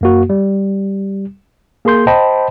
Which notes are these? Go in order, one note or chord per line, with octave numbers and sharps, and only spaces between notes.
F#2 A#3 F#4
G3
A#3 G#4 A#4 C6 G6
C5 D#5 G5 A5 B5